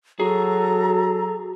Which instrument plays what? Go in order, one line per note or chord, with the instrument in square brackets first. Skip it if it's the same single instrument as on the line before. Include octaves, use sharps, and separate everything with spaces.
[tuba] F#3 [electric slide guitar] F#4 G#4 [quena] A4 [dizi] A#5